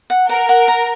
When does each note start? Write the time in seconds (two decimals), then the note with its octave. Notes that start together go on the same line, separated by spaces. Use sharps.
0.10 F#5
0.29 A#4 F#5
0.49 F#5
0.68 A#5